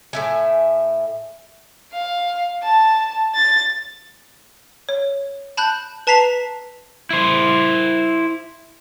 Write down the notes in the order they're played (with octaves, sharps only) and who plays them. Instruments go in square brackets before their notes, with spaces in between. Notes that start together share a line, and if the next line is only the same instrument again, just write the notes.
[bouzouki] A2 E5 G#5
[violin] F5
A5
A6
[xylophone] C#5
A5 B5 F#6 G6
B4 A5 A#5 B6 C7 F7
[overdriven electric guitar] E4 C5